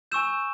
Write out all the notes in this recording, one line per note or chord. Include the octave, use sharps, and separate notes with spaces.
G#5 C#6 E6 G6 E7